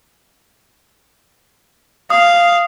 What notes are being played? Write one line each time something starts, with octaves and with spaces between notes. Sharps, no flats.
F5 D#6